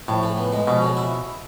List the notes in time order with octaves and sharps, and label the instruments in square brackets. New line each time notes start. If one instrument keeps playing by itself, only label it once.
[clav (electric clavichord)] A2 [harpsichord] F3
[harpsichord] C#3
B3
G#3
[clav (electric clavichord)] B2 [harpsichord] F3
[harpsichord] C#3
E4